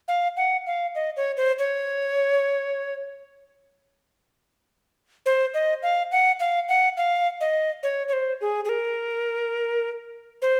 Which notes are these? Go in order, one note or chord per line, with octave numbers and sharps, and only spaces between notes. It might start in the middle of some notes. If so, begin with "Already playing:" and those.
F5
F#5
F5
D#5
C#5
C5
C#5
C5
D#5
F5
F#5
F5
F#5
F5
D#5
C#5
C#5
C5
G#4
G#4
A#4
C5